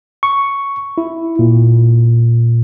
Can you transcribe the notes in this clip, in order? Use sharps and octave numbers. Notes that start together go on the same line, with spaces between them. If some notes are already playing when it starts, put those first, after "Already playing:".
C#6
E4
A#2